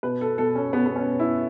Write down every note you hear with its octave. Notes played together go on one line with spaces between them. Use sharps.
B2 B4
A4
B2 A4
C#4
B2 B3
B3
C#4
B2
E4